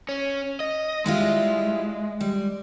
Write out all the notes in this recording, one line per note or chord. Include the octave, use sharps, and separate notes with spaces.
C#4
D#5
G3 G#3 E4 F4
G3